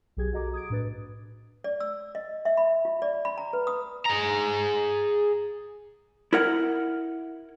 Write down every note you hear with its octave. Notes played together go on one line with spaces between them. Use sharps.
B1 F#3 G4 G#4 G#6
F#4 A4 D#5 A#5 D6
D#6 G#6 D7
A2 D4 B4 A6
D5
E6
D#5
E5
B5
F4
D5
B5
A#5
B4
D#6
G#4 A#5
E4 A#4 F#5